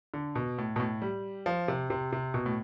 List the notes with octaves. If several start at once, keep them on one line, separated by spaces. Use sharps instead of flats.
D3
B2
A2
B2
A2
G3
F3
C3
C3
C3
B2
A2